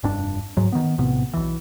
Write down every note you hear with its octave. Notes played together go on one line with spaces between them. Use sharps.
F1 G2 D4
G#2 F#3
D#3 B3
A#1 A2 C3 B3
B1 E3